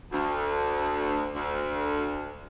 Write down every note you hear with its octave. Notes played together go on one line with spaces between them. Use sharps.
D2
D2